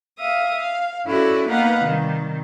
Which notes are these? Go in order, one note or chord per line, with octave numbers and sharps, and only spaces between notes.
E5 F5 D#6
F5
C#4 E4 F#4 A4 D5
A#3 B3 D#4 B4 F5 F#5
C3 D#3 G3